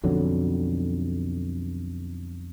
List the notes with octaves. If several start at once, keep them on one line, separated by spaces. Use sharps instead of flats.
B1 F2 D3 F#3